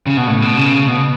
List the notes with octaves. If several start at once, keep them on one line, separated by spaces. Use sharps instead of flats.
C#3
B2
A2
B2
C#3
B2